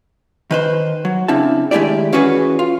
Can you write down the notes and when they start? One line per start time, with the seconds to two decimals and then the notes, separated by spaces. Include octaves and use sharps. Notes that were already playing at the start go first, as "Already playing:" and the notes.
0.51 D#3 B4 C5
1.05 F#3
1.28 C#3 C4 D4 E4 A5
1.71 D#3 G#3 A3 E4 G4 D5
2.13 E3 C#4 F#4 G#4 B4 C#5
2.59 F4